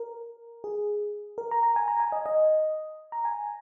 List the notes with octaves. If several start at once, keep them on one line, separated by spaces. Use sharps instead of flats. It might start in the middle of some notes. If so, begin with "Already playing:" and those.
Already playing: A#4
G#4
A#4
A#5
A#5
G#5
A#5
G#5
D#5
D#5
A#5
G#5